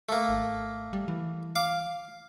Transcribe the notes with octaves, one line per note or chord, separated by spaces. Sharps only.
A3 A#3
G#1
G3
E3
F5 D6